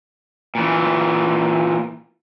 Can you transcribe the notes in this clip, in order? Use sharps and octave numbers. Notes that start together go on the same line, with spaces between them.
A#2 E3